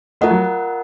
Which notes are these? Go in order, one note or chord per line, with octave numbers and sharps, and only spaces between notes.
A3 F4 A#4 D#5 F#5
F#3